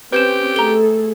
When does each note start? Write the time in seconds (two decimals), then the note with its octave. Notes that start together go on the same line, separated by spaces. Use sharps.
0.12 C4 C#4 G4 B4 G6 E7
0.56 A3 G#4 A4 A#5 G7